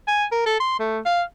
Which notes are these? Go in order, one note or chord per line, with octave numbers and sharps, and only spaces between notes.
G#5
A#4
A4
C6
A3
F5